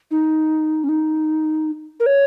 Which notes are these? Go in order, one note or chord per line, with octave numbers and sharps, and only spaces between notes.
D#4
C#4
D#4
A#4
C#5